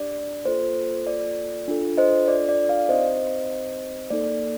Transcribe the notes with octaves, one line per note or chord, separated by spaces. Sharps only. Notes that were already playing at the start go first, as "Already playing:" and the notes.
Already playing: D4 G4 D5
A#3 F4 A4 C5
D5
D4 F4 A4
C5 D#5
D5
D5
D5 F5
C4 D#4 G4 C5 D#5
A#3 D#4 A4 D5